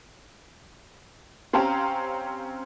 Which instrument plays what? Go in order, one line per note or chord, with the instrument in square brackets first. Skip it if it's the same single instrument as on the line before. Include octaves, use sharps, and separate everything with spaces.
[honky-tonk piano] C4 C#4 G4 F5 A#5